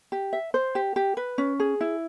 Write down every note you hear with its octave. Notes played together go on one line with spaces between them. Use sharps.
G4
E5
C5
G4
G4
B4
C#4
G#4
E4